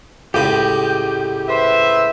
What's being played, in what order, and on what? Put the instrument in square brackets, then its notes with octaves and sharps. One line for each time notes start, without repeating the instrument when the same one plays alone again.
[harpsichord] C#2 A2 [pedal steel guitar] G4
[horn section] B4 C5 E5